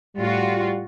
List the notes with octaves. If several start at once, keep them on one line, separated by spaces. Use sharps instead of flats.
A2 G3 F4 F#4